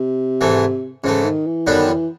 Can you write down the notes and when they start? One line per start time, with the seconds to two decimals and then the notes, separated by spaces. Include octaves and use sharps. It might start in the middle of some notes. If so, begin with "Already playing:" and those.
Already playing: C3
0.41 G#2 E3 A3
1.04 G#2 C#3 E3 A3
1.25 D#3
1.47 E3
1.67 F#2 D3 D#3 G3 B3 D4
1.89 E3